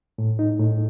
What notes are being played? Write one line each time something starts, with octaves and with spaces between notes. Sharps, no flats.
A2
D#4
A2